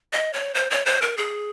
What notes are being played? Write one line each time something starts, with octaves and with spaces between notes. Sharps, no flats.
D#5
C#5
C5
C#5
C5
A#4
G#4